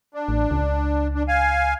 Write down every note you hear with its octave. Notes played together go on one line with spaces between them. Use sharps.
D4
A1
C#2
D4
F5 G#5